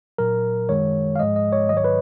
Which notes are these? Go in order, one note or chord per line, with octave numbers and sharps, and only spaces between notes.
A#2 F#3 A#4
F#2 D#3 G#3 C#5
F5
G#2 F3 G#3 D#5
D#5
C#5
G#2 D#3 F#3 D#5
C#5
B4